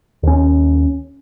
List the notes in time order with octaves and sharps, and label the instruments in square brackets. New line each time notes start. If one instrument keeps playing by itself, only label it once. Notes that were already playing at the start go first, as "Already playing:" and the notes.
[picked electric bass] D#2 C#4